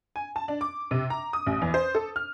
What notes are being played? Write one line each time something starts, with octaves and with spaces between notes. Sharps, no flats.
G#5
A5
D4
D6
C3
A#5
D#6
A1
E2
C5
A4
F6